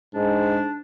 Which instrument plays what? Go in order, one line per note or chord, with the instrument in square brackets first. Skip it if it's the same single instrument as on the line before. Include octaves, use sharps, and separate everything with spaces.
[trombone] G#2 [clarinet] D4